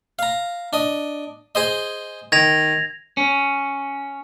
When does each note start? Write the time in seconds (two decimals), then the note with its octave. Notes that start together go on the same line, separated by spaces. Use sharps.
0.19 F5 A#5
0.73 D4 D#5
1.55 G#4 C5 D#5
2.32 D#3 G#6 A#6 F7
3.17 C#4